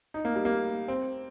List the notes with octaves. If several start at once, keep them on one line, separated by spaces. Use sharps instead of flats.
D#4
A#3
G3
A#3
C4